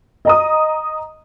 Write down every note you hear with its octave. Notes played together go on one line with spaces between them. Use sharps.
D#5 A#5 D#6